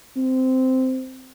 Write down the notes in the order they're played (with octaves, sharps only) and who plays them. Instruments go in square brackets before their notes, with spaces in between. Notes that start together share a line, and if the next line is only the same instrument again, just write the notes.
[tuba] C4